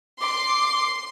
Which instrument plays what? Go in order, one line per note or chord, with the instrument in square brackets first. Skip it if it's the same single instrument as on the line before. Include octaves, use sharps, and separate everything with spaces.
[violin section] C6 C7 [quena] D6